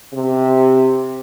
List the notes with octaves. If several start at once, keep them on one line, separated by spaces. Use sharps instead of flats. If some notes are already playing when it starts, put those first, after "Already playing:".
C3